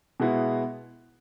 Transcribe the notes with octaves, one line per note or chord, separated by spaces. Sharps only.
B2 G#3 B3 E4